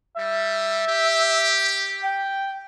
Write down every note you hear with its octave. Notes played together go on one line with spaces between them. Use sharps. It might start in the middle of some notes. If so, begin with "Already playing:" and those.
G3 E5
G4
G5